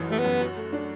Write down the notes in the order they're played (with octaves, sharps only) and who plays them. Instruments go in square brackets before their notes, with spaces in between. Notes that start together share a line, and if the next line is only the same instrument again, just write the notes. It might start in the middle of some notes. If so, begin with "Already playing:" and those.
Already playing: [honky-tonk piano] A1 F#2 E3
[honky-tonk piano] G3 [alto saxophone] A3
[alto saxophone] B3
[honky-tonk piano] F#2
F#4
A3
D4